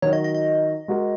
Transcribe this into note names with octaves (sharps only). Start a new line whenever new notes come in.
D#3 F#3 D#4 F#4 C#5
D#5
D#5
D#5
G#3 F#4 A#4